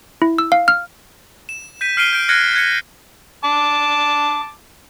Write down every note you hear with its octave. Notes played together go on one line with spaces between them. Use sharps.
E4
E6
F5
F6
E7
G6 B6 D#7
F6 C7 D7 D#7 G7
G6 D7
F6 F#6 G#6 A#6 C#7 D#7
F#6 G#6 C#7
A5 D6